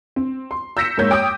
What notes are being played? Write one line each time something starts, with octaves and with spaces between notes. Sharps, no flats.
C4
C6
E6 G6 A#6 B6 C#7 E7
G#2 A#3 C#5 G6
C#5 G5 D6 D#6